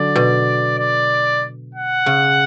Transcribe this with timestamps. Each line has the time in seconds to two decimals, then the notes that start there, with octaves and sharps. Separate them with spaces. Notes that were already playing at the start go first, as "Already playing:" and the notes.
Already playing: D3 F#3 D5
0.16 B2
0.79 D5
1.75 F#5
2.06 C#3